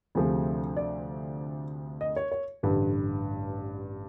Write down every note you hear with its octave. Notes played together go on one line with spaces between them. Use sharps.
D2 C3 F3 A3 G#4
D5
D#5
C#5
C#5
A1 G2 D3 B4